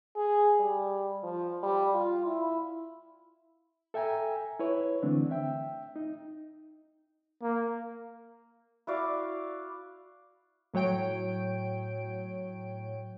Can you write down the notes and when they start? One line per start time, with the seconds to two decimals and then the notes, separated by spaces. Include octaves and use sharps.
0.16 G#4
0.60 G3
1.23 F3
1.63 G3
1.94 F4
2.26 E4
3.94 A4 E5 G5 G#5 A#5
4.59 E4 B4 C#5
5.02 D3 E3 A3 C4 D4
5.31 E5 G5
5.96 D#4
7.42 A#3
8.87 E4 F#4 D5 F5
10.74 A2 F#3 C#5 G5 D7